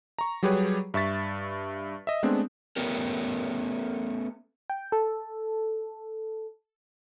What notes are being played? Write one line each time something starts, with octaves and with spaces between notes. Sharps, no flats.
A#5 C#6
F#3 G3 G4 G#4 B4 C#5
G2 E5 C#6 A6 B6
D#5 E5
G#3 A3 B3 C4 D4
A3 B3 C#4 G4 A#4
G5
A4